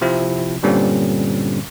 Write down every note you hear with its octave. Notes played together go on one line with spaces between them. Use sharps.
C3 F3 C4 E4
G2 A#2 D3 G3 C4 C#4